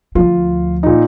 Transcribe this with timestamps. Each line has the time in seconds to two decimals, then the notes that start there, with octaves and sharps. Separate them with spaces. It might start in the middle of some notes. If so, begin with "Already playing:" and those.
0.15 D2 F3 F4
0.83 A#2 D#4